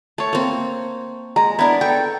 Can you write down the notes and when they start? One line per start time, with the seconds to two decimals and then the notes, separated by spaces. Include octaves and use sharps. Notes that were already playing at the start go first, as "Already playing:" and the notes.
0.18 A3 C#5 A5
0.33 A#3 C4
1.36 G#3 A#5
1.59 B3 D4 E4 A#4
1.81 A4 G5 C#6